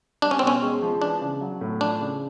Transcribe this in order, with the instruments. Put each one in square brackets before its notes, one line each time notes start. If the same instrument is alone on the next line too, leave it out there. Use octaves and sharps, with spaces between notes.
[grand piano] G3 [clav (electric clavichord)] D4
[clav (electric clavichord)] C#4
C4
[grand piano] B2 [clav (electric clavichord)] C#4
[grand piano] G#3
F3
[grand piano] E3 [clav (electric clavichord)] D4
[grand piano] C#3
F#3
A2
[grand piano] F3 [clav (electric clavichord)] D4
[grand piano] C#3